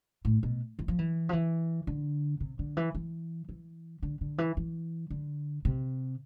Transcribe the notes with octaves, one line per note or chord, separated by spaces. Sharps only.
A2
B2
E3
F3
E3
F3
E3
D3
C3
D3
E3
E3
E3
D3
D3
E3
E3
D3
C3